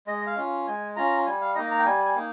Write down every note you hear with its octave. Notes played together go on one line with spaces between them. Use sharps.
G#3 D#5
F5
C#4 F4
G#3 G#5
C#4 F4 A#5
G3 G#5
F5
A#3 D#4 D#5
A#5
G5
G3 G#5
G#5
A#3 D#4